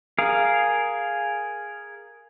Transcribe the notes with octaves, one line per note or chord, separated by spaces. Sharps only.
G#4 A#4 F5